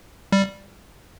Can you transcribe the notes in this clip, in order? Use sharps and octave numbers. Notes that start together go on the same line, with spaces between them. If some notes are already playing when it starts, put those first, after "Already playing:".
G3